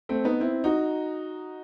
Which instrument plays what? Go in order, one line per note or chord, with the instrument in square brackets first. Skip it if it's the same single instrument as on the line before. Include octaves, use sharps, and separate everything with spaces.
[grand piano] A3 C4
B3 D#4
C4 E4
D#4 F#4